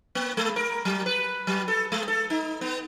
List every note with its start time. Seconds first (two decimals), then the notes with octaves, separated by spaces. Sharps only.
0.15 A#3
0.37 G#3
0.56 A#4
0.85 F#3
1.06 B4
1.47 F#3
1.68 A4
1.92 G#3
2.08 A4
2.30 D#4
2.61 B3